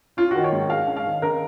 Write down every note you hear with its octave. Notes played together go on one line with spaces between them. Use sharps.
C#4 F4
F#4
D#3
C#5
G#2
G#3 F5
C#4
F5
D#3
C#3 A#4